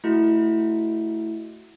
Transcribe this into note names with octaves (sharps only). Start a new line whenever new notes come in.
A3 E4 F#4